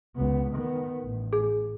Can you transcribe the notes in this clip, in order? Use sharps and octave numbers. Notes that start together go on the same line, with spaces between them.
C#2 B3
D#3 B3
A1
G#4